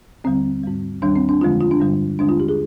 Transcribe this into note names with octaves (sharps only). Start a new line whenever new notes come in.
D#2 D3 G3 C4
G#2 G3
D#2 D#3 G3 D4
C4
D4
F2 D3 F3 G#3 F4
F4
D4
G2 D3 G3
D#2 D3 G#3 D4
F4
G4
G#4